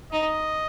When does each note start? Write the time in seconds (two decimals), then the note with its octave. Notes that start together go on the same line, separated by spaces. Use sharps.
0.12 D#4 D#5